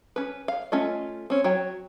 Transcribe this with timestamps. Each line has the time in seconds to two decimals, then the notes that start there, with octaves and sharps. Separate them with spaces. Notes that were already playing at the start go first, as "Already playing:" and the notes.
0.16 C#4 B4
0.48 F5
0.72 A3 C#4 F4 D#5
1.30 C4 C#4
1.44 F#3 F#4 C#5 G5